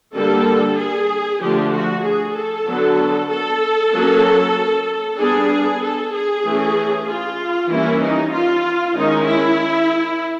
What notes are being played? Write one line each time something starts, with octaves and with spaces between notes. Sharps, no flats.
D3 G3 A#3 A4
G#4
D3 F3 A3 D4 G4
F#4
G#4
A4
D3 F#3 B3
A4
F#3 A#3 C#4
G3 B3 D4 G#4
A4
G#4
E3 A3 C#4
F4
E3 G3 A#3 C#4 E4
D#4
F4
D#3 G#3 C#4 D#4
E4